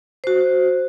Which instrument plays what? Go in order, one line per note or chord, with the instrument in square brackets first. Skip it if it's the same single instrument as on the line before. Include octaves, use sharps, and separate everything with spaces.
[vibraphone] F#4 C5